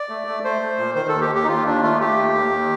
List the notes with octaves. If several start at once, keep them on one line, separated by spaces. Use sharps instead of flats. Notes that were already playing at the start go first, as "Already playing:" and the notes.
Already playing: D5
A3
A3
A3 C5
A3
A#2
D#3 C5
D#2 A4
G4
D#2
G4
D#4
D#2 F4
D#2 D4
A3 F4
A3 G4
D#2
D#2
D#2